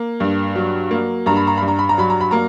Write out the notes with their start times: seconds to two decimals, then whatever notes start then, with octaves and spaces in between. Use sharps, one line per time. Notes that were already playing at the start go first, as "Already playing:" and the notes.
Already playing: A#3
0.20 G2
0.55 F#3
0.91 A#3
1.26 G2 A#5
1.37 B5
1.47 A#5
1.58 G2 B5
1.68 A#5
1.79 B5
1.89 A#5
1.98 F#3 B5
2.10 A#5
2.21 B5
2.31 A#3 A#5